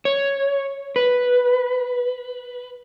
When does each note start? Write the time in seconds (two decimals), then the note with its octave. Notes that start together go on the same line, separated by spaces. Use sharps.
0.05 C#5
0.96 B4